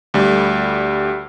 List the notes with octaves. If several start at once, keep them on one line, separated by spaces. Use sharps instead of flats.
D2 G3